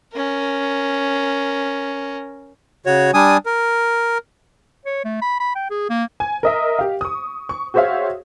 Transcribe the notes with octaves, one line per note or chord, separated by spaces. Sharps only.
C#4 A#4
C#3 F#4 C#5
G3 D4 G#5 D#6
A#4
C#5
A3
B5
B5
G5
G#4
A#3
G#5
A#4 D#5 E5
G4 F5
C#6 D#6
C#6
F#4 G#4 C5 C#5 E5 F5